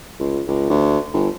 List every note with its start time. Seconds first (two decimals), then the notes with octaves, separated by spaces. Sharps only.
0.20 C#2
0.47 C#2
0.70 D2
1.13 G1